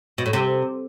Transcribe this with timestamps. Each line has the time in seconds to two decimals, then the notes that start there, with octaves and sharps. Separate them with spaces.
0.18 B2
0.26 A2
0.33 C3